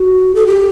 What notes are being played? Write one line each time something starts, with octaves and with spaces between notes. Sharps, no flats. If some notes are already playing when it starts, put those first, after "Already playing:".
Already playing: F#4
A4
G4